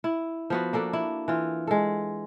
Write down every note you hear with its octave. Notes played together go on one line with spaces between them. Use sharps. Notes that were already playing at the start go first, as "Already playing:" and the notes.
E4
F3 B3 F#4
A#3 D4 A4
E4
E3 F4
G#3 A4